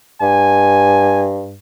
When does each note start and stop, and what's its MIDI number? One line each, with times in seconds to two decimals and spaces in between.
0.22 1.57 43
0.22 1.27 80